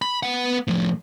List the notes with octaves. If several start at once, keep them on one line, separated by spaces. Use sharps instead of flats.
B5
B3 F#5
A2 F3